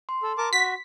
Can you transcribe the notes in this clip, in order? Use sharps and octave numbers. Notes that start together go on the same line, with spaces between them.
C6
A4
A#4 A5 D6
F#4 B6